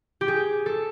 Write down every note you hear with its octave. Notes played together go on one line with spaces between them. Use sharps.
G4
G#4
A4